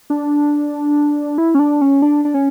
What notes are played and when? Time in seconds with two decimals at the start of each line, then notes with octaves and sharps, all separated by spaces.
0.10 D4
1.38 E4
1.55 C#4
1.59 D4
1.81 C#4
2.02 D4
2.25 D4
2.34 C#4